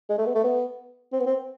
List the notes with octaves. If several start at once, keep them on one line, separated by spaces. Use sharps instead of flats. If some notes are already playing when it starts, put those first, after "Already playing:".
G#3
A3
B3
A3
B3
C4
B3
C4